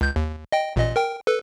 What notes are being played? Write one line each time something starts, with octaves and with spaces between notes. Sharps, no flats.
C#2 G6
D#2
D#5 G5
A1 A#2 D#5
A#4 G5
A4 B4